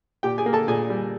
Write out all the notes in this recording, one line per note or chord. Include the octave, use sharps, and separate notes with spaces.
A#2 G4 G5
G#4 G#5
A#3
A4 A5
A#2 G#4 G#5
G3